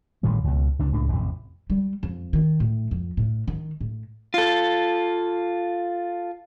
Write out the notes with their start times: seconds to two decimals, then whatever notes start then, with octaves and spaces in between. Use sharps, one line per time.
0.23 A1 A2 D#3 G3
0.44 C#2 B2
0.79 C#2 C3 D4
0.92 C#2 A2 G#3 D4
1.10 A1 F2 C3
1.70 G3
2.03 F2
2.33 D#3
2.60 A2
2.91 F2
3.17 A2
3.47 D#3
3.81 A2
4.34 F4 A4